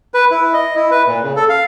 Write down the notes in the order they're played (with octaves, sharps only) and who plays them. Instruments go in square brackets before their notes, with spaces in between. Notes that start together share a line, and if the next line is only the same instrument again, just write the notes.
[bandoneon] B4
E4
D#5
E4
B4
A#2
C#3
A4
F5